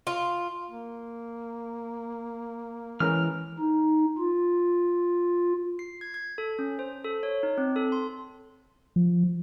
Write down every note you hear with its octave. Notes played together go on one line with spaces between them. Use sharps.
F4
A#3
E3 G#3 C#4 A#4 F6
D#4
F4
C7
G#6
G#6
A4
C#4
C5
A4
C#5
D#4
C4
A4
C6
F3